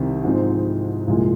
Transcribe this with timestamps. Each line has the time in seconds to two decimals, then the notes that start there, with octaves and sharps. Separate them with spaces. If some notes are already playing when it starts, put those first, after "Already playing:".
Already playing: C2 C3 D#3
0.24 G#2 F3 G#3 C4 D#4
1.07 C2 A#2 F3 G#3